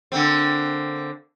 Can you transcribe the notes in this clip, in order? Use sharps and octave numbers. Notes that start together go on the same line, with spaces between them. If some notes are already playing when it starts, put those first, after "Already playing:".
D3 A#3 C4